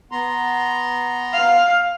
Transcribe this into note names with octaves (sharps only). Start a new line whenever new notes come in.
B3 A#5 C6
F5